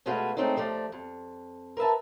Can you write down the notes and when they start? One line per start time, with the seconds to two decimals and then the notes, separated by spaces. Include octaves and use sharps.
0.06 B2 G#3 A3 F4 F#4 B4
0.37 G#3 A3 C4 C#4 D#4
0.56 D#2 F3 A3 D5
0.92 F2
1.77 A#4 B4 E5 A5